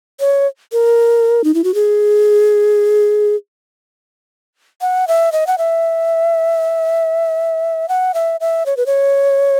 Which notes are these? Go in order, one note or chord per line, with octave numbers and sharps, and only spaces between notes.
C#5
A#4
D#4
E4
F#4
G#4
F#5
E5
D#5
F#5
E5
F#5
E5
E5
C#5
B4
C#5